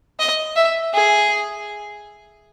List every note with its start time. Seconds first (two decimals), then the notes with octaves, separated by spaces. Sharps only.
0.19 D#5
0.56 E5
0.93 G#4